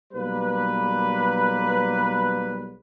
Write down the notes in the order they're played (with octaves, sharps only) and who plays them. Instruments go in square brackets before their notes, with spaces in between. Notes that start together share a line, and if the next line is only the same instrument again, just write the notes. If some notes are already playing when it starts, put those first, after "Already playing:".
[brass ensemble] B1 G3 A#3 B4